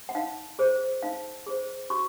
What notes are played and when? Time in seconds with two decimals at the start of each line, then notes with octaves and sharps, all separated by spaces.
0.09 F#5
0.15 D#4 F5
0.59 G#4 C5
1.03 D#4 F5
1.46 G#4 C5
1.90 F#4 C#6